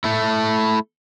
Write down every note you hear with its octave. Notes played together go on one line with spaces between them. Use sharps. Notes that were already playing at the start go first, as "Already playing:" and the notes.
A3 E4